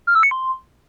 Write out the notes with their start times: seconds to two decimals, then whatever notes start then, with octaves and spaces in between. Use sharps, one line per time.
0.07 F6
0.15 E6
0.23 C#7
0.31 C6